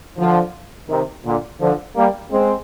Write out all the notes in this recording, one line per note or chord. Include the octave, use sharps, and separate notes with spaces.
D3 F3
C3 D#3
A#2 D3
D3 F3
G3 A#3
G#3 C4